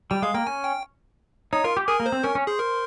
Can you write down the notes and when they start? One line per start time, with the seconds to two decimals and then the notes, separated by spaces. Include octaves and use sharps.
0.11 G3 G5
0.22 G#3 F5
0.34 A#3 G5
0.47 C#4 G#5
0.64 G5
1.53 D#4 C#5
1.64 F4 A#4
1.77 G4
1.88 G#4 A#4
2.00 A#3
2.06 C5
2.12 C4
2.23 C#4 A#4
2.35 C#4
2.47 G#4 C5
2.59 A#4